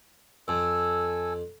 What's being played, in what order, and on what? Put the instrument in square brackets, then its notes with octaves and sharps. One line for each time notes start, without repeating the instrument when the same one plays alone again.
[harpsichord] F2 [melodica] A4 G#5 E6